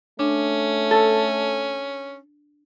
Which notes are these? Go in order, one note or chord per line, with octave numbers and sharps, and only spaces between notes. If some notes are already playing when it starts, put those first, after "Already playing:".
A3 C#4 D4
A4